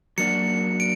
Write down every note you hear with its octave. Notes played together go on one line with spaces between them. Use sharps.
F#3 A#3 D4 F#4 C#7
D7